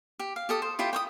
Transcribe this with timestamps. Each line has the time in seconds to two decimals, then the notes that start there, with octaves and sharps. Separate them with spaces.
0.19 G4
0.36 F5
0.49 G4 A4 D#6
0.62 C5
0.79 E4 F4 G4 G5
0.93 G5 C#6 D#6